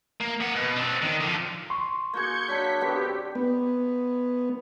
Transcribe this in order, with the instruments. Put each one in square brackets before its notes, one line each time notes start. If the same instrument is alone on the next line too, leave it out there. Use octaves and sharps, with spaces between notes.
[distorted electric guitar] A#3
A#3 F#5
B2
C4 D4
D#3
D3 F3
[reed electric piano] C6 C#6
[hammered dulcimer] A#3 F#4 G#4 [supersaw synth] G6 G#6 C#7
[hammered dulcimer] F#3 D4 [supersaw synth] B6
[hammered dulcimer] D3 B3 C4 [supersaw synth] G4
[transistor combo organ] B3